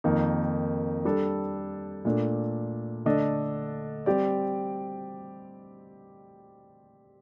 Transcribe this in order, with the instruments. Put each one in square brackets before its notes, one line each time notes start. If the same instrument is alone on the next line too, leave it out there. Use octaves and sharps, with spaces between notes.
[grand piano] F2 D#3 A#3 D#4
G3 D4 A4
A#2 A3 D4
D3 A3 D4 A4 D#5
G3 C4 G4 D5